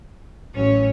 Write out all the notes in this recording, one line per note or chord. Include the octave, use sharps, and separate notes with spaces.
A1 F#3 C#4 C#5